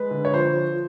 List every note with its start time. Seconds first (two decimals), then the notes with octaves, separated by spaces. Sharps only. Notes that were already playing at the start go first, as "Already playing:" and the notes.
Already playing: G#3 B4
0.11 D3
0.25 C#5
0.33 F3 C5
0.56 F3